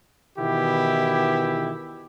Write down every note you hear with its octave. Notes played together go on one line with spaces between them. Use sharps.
B2 D#3 E3 B3 E4 G4